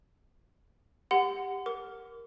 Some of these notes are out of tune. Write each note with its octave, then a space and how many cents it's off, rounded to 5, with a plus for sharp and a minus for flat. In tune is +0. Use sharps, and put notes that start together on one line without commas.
G4 +15 F#5 +0 C6 -40
A#4 +0 D6 -30